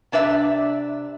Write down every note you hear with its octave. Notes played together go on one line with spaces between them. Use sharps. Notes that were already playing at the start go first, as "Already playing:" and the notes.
C3 D4 B4 E5